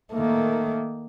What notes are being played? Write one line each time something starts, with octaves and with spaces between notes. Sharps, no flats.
D#3 A3 A#3